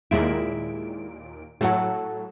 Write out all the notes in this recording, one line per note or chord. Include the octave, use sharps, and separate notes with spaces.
D#2 A#2 G#3 E4 D7
A2 F#3 A4 F#5